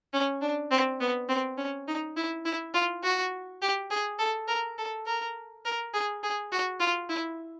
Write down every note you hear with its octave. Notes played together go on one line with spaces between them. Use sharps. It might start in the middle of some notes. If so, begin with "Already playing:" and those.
C#4
D4
C4
B3
C4
C#4
D#4
E4
E4
F4
F#4
G4
G#4
A4
A#4
A4
A#4
A#4
G#4
G#4
F#4
F4
E4